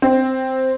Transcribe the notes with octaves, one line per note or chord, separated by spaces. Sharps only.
C4